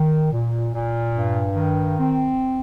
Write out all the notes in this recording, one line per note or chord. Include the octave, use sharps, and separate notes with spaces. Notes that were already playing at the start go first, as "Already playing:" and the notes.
Already playing: D#3
A#2
A#2
G2
D#3
C4